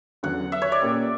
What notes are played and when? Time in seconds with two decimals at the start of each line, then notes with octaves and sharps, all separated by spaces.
0.23 E2 D3 F#3 C#4 F#5
0.52 E5
0.62 C#5
0.72 D5
0.81 A#2 A#3 C#4 G4